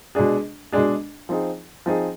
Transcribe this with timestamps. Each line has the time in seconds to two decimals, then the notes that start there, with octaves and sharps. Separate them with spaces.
0.15 B2 G#3 D4 G#4
0.72 B2 G#3 D4 G#4
1.29 F3 C4 D#4 G#4
1.86 F3 C4 D#4 G#4